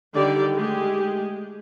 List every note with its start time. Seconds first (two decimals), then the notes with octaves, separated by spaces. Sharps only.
0.14 D3 D#3 G3 G4 D5
0.54 G#3 A3 G4 G#4